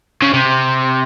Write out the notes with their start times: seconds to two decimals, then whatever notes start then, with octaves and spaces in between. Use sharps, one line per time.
0.22 C#3
0.33 C3